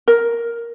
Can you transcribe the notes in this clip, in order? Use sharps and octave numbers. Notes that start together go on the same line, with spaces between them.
A#4